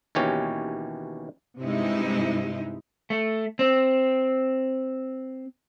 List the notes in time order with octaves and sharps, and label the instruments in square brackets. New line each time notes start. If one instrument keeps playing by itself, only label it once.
[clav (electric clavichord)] D#2 B2 E3 C#4 G4 C#5
[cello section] G2 C3 G#3 D#4 E4
[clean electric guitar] A3
C4